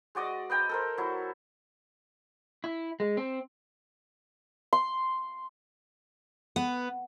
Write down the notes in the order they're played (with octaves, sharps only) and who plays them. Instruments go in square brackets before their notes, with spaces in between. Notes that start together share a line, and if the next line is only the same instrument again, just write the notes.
[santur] G#3 F#4 D5 D#5
B4 D#5 G5 A#5
A4 A#4 C5
F#3 E4
[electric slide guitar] E4
G#3
C4
[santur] C6
[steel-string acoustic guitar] B3